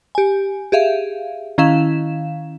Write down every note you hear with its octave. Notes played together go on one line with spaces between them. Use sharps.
G4 G#5
G4 G#4 E5 F5
D#3 C#4 E4 F5 E7